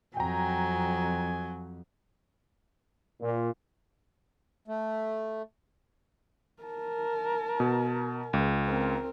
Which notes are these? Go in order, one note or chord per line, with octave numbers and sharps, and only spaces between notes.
F2 F#3 G5 G#5 A#5
A#2
A3
A#4 A5
B2
C#2
C4 A#4